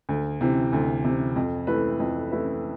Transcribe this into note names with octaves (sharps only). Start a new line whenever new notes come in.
D2
C3 E3
D2
C3 E3
F2
E3 A3 E4 B4
F2
E3 A3 E4 B4